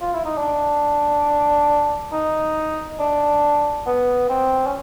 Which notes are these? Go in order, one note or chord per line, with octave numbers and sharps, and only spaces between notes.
F4
E4
D#4
D4
D#4
D4
B3
C4
C#4